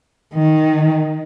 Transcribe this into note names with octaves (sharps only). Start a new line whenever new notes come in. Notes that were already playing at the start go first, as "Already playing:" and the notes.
D#3